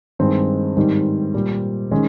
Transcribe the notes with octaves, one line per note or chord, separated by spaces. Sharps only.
G2 D#3 G#3 C4
G#2 D#3 G3
A#2 G3
D#3 G#3 C#4